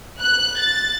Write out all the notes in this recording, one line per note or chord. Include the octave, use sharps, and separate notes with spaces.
F#6
A6